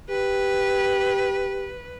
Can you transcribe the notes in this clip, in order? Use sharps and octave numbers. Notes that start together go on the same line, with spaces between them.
G4 B4